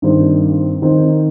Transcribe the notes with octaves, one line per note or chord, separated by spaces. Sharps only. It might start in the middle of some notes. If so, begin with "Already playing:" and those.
G2 D#3 C4
D#3 C4 D#4